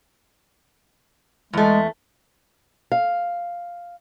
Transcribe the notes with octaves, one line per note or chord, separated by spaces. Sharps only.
E2 G#3 A3
F5